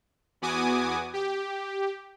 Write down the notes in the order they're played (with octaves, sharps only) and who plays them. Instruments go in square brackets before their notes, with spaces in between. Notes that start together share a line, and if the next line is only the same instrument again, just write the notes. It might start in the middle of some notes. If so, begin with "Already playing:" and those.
[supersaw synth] E2 B3 F#4 G#5 D6 D#6
G4